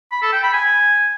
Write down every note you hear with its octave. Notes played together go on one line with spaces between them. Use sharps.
B5
A4
G5
B5
G#5